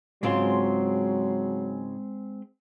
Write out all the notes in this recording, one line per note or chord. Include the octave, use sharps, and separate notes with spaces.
G#2 C#3 F#3 G#3 C4 F4 C6